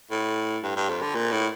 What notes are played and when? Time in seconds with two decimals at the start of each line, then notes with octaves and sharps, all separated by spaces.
0.11 A2
0.63 G2
0.76 G2
0.89 F2
1.02 D3
1.15 A#2
1.31 A2